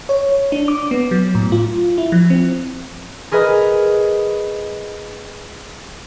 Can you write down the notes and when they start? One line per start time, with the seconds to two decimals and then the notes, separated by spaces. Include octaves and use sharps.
0.09 C#5
0.52 D4
0.68 D6
0.91 B3
1.11 F#3
1.35 A2
1.52 F4
1.98 E4
2.12 F3
2.30 C4
3.32 G#4 A#4 B4 D#5